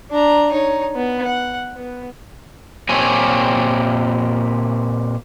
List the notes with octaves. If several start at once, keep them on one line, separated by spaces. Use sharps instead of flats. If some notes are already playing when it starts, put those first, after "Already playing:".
D4 A#5
D#4 C#5
B3
F#5
B3
A#2 C4 G4 C#5 G#5